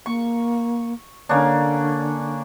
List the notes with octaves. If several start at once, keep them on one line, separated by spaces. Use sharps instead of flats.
A#3 C#6
D3 A#3 C#4 D4